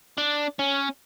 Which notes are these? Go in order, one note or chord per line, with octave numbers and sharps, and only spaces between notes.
D4
C#4